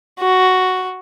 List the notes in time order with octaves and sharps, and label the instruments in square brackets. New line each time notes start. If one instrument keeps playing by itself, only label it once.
[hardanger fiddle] F#4